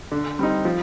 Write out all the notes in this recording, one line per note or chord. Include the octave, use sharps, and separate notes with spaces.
D3
G3 C4 D#4
F3